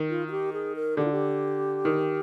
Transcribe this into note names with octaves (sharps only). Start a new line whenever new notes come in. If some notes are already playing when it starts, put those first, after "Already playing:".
Already playing: D#3
F4
F4
G4
G#4
A#4
D3 G4
F4
G4
D#3